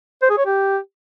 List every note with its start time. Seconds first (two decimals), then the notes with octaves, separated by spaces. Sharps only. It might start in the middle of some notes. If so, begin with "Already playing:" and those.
0.22 C5
0.30 G#4
0.38 C#5
0.46 G4